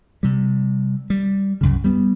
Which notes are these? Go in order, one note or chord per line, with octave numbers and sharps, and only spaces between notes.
C3 G3
G3
C2 F#2 C#3
G3 B3